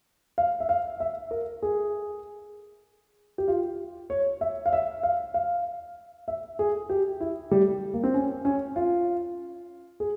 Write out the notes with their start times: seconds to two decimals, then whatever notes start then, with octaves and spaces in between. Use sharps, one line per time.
0.38 F5
0.60 E5
0.69 F5
1.00 E5
1.31 A#4
1.63 G#4
3.38 G4
3.48 F4
4.10 C#5
4.41 E5
4.66 F5
4.73 E5
5.03 F5
5.34 F5
6.28 E5
6.59 G#4
6.89 G4
7.20 E4
7.51 G3
7.94 A#3
8.04 C4
8.14 C#4
8.45 C#4
8.76 F4
10.00 G#4